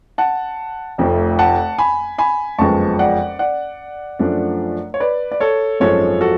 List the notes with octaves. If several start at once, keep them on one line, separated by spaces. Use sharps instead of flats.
F#5 A5
F1 F2 F3 A3
F#5 A5
G#5 B5
G#5 B5
F#1 F2 F3 G#3 B3 A5 C#6
D5 F#5
D5 F#5
F#2 F3 A3 D4
C#5
B4 D5
D5
A4 C#5
G#1 F#2 F3 G#3 A4 C#5
F#4 A4